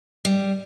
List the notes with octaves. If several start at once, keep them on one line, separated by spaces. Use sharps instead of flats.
G3